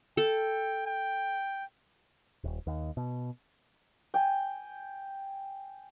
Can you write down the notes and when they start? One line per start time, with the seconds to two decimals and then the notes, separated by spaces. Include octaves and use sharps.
0.17 A4 G5
0.86 G5
2.44 D#1
2.67 D#2
2.97 B2
4.14 G5 G#5